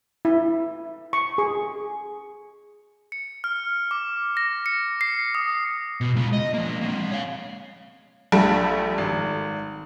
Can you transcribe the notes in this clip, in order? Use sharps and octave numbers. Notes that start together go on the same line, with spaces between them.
E4
C#6
G#4
C#7
F6
D6
A#6
C#7
C7
D#6
B2
G#3 F4
D#5
F3 A#3
A#3 C4
C#5 F5
A#1 G3 A3
G#1